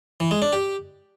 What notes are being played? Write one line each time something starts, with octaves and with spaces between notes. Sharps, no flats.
E3
G#3
D4
G4